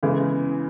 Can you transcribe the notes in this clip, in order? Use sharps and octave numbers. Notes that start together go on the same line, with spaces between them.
C#3 E3 G#3 B3